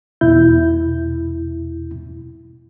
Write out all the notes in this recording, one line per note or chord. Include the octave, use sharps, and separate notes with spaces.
E2 B2 E4 G6